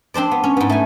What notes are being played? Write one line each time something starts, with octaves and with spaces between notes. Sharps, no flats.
C4 D4 C5 D5
B3
C#4
G#2 B3
A3 G#5